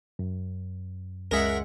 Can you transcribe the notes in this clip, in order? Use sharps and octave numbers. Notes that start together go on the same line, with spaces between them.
F#2
C#2 G#3 A#4 E5 F#5